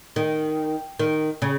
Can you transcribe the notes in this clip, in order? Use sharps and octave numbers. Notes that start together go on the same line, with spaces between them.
D#3
D#3
C#3